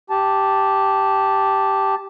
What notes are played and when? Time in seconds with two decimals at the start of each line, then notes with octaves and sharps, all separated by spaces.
0.10 G4 A5